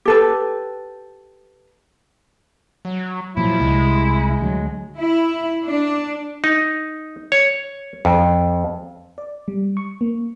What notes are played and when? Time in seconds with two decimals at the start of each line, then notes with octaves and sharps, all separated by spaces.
0.05 G4 A4 B4
2.85 F#3
3.37 A#2 F3 F#3 E4
3.60 C2 G#3
4.41 D2 F#3
5.00 E4
5.67 D4
6.44 D#4
7.32 C#5
8.05 F2
9.18 D5
9.48 G3
9.77 C#6
10.01 A#3